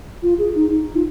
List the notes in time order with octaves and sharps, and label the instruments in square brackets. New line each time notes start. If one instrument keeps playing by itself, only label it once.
[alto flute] F4
G#4
D#4
D#4
F4